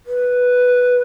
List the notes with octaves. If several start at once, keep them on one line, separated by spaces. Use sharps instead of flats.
B4